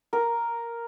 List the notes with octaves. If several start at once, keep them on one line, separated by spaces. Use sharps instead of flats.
A#4